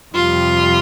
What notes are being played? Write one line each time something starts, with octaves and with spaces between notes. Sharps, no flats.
F2 C3 G3 F4